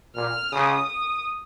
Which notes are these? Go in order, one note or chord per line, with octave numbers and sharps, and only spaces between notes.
A#2 F6
C#3 D#6
D#6